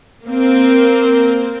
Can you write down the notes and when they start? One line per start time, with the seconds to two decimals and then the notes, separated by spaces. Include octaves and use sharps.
0.24 A#3 C4